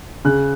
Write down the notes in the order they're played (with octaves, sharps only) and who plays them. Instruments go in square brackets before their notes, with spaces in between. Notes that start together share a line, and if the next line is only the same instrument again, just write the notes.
[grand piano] C#3 F#6